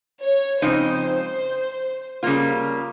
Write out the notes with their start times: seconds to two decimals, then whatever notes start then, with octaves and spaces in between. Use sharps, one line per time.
0.22 C#5
0.62 F2 C#3 G#3 D#4 C5
2.23 C#3 G3 A#3 F4